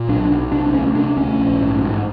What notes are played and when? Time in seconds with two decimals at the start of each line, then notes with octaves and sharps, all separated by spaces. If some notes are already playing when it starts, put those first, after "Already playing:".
Already playing: A#2
0.08 B1 D4
0.31 B1
0.52 C3 D4
0.73 D2 C#4
0.95 C3 D4
1.17 D2 C#4
1.38 A#1
1.60 G#2
1.83 G#2